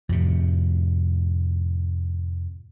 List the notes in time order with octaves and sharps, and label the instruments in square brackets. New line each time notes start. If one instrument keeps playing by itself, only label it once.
[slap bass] F2 A2 C3